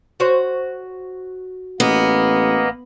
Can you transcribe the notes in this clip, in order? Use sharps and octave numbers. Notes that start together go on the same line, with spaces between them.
F#4 C5 C#5
A1 A#3 B3 D#5